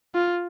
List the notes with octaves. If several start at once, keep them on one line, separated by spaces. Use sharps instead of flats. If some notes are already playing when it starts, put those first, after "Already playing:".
F4